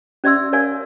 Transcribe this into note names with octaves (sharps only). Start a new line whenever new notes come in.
C#4 D5 E5 C6 E6
A#4 C#5 D5 F5 G#5